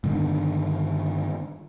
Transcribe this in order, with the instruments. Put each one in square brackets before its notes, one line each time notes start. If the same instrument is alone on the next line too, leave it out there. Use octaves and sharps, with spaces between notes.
[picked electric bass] G2 D3 D#3